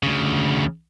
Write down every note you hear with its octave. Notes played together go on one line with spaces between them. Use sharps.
D2 C#3